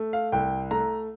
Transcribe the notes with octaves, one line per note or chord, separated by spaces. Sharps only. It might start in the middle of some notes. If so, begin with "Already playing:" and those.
Already playing: A3
F5
C2 G5
A3 A#5